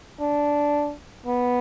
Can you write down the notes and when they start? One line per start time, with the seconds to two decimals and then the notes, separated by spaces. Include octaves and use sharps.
0.20 D4
1.26 B3